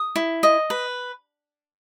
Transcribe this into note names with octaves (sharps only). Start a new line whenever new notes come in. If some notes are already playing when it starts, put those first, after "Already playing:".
Already playing: D#6
E4
D#5
B4